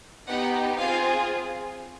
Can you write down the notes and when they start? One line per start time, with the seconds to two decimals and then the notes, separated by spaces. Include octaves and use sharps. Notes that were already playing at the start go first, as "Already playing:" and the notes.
0.27 B3 D#4 G4 F#5
0.78 C4 F4 G#4 F5